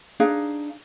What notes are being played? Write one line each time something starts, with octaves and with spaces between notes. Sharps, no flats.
D4 D#4 G#4 F5